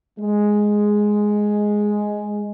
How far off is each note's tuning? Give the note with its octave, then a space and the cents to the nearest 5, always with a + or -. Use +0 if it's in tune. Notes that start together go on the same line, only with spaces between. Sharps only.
G#3 +0